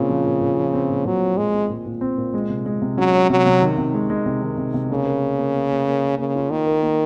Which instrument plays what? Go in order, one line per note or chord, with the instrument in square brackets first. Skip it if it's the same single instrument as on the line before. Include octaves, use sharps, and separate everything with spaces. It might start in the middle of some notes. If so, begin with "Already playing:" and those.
Already playing: [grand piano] A#2 C4 [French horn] C#3
[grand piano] F3
A#2
A#2
F3
C4
A#2
[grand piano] A#2 [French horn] F#3
[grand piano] C4
[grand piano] A#2 [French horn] G#3
[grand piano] C4
A#2
A#2
C4
A#2
G#3
C3
G#3
C3
[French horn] F#3 [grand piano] C#4
[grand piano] C#4
[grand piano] C3 [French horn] F#3
[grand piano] C3
D#3
C3
G#3
G#3
C3
D#3
C3
C3
[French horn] C#3 [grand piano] A#3
[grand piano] A#4
A#3
A#3
A#3
A#3
A#3
A#3
[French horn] C#3 [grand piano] A#3
[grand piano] F4
[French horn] D#3 [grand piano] A#3
[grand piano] A#4
A#3